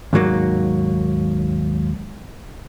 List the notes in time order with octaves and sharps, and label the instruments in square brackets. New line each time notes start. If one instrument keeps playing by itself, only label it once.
[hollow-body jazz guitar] D#2 G#2 F#3 A#3